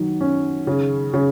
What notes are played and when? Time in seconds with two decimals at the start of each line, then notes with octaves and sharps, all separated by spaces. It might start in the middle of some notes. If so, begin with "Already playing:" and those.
Already playing: D#3 F#3
0.21 C#4
0.67 C#3
1.14 C#3